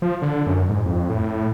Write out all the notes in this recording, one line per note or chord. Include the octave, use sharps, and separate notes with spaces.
F3
D3
F#2
G#2
F2
A2